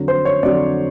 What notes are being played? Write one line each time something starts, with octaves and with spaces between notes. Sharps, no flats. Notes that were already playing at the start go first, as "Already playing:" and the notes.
Already playing: F2 D3 F#3
C5
C#5
F2 D3 F#3 D5